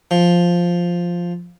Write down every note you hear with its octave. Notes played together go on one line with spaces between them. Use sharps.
F3